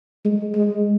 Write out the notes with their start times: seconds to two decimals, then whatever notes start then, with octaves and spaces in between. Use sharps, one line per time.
0.25 G#3
0.55 G#3